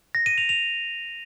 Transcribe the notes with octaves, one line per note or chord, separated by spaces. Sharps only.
A#6
D#7
F7
F7